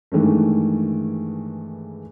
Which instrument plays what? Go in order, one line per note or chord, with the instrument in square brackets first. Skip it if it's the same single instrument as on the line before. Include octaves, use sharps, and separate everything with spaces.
[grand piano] G2 D#3 E3 G#3 A3